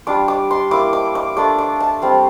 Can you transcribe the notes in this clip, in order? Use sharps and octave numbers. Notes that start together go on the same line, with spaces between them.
G3 D4 F4 D6
D6
C6
A#3 E4 D6
D6
D6
A3 D4 F4 D6
D6
A5
G3 C4 F4